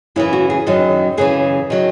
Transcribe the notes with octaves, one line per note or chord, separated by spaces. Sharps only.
F#2 C#3 E3 E4
F#4
G#4
F#2 D#3 F#3
F#2 C#3 E3 G#4
D#3 F#3